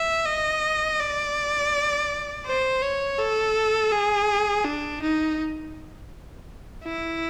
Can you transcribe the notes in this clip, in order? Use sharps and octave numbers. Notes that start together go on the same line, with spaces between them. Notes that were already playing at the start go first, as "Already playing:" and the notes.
Already playing: E5
D#5
D5
C5
C#5
A4
G#4
D4
D#4
E4